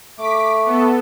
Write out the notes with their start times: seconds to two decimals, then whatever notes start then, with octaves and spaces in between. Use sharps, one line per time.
0.18 A3 D6 B6
0.66 B3 A4